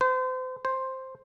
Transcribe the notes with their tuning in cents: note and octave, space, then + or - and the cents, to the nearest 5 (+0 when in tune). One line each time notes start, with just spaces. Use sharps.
C5 -35
C5 +5